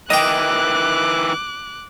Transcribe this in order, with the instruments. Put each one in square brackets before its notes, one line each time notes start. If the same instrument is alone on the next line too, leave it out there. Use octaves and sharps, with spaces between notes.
[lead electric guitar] D#3 E3 [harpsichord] D#5 G5 [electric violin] D6 F#6